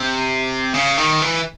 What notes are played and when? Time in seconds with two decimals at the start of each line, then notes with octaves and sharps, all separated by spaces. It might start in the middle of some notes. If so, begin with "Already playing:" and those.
Already playing: C3
0.74 C#3
0.97 D#3
1.22 E3